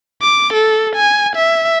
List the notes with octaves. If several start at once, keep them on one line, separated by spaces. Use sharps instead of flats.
D6
A4
G#5
E5